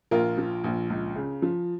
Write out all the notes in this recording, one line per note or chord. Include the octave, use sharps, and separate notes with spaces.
A#1 F4 A#4
F3
A#1
C#2
C#3
F3